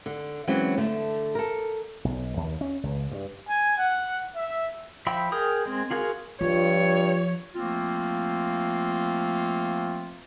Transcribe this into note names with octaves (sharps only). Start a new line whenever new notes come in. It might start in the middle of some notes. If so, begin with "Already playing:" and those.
D3
E3 F#3 G#3 C4 C#4
D3 A3
A4 A#4
B1
D#2
C#4
C#2
G2
G#5
F#5
E5
F3 E5 G5 B5 E6
G#4 A#4 G5 D#6
G#3 C4
F4 F#4 G#4 A#4
G2 F3 F4 C#5
F3 A3 A#3 C4 F4